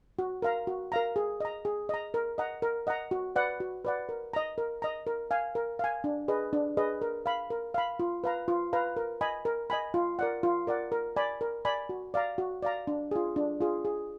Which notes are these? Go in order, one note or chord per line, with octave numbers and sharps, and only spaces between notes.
F#4
A#4 F5 A#5
F#4
A#4 F5 A#5
G#4
D#5 A#5
G#4
D#5 A#5
A#4
D#5 F#5 A#5
A#4
D#5 F#5 A#5
F#4
B4 D5 F#5
F#4
B4 D5 F#5
A#4
D#5 A#5
A#4
D#5 A#5
A#4
F5 G#5
A#4
F5 G#5
D4
G#4 B4 D#5
D4
G#4 B4 D#5
A#4
F5 B5
A#4
F5 B5
F4
B4 F5 A#5
F4
B4 F5 A#5
A#4
D#5 G#5 B5
A#4
D#5 G#5 B5
F4
A#4 D5 F#5
F4
A#4 D5 F#5
A#4
D5 G#5 B5
A#4
D5 G#5 B5
F#4
D5 F5 A#5
F#4
D5 F5 A#5
D4
F4 G#4
D4
F4 G#4
G#4